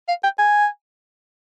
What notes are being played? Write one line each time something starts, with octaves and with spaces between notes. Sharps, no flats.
F5
G5
G#5